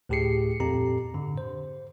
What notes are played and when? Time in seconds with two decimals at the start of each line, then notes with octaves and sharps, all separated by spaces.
0.09 D2 A2 G4 G#4 C7 C#7
0.60 F2 A#2 C4 G4 A4 A#5
1.14 G#2 D3
1.38 C5